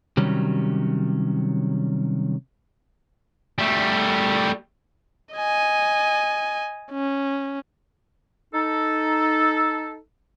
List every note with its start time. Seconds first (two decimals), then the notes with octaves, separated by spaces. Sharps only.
0.17 C3 D#3 F#3 G3 C#4
3.58 G3 A3
5.34 D#5 G#5
6.92 C#4
8.53 D#4 A4